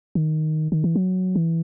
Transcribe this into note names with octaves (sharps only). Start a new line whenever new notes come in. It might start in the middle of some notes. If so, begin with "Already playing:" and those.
D#3
D#3
E3
F#3
E3